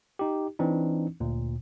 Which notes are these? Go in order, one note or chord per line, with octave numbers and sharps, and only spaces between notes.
D#4 G4
E3 C4 D4 D#4
D2 A#2